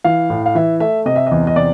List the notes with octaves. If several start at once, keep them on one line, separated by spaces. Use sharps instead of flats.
E3 F5
A2
F5
E3 E5
A3 E5
C3 D#5
E5
E2 D#5
D#5
C3 D5